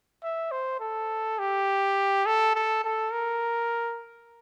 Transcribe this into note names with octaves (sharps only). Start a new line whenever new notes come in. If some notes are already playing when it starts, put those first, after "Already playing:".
E5
C5
A4
G4
A4
A4
A4
A#4